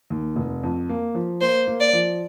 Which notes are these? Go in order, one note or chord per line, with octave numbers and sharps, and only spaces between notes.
D#2
F1
F2
A#3
F3
A#3 C5
A#3
D5
F3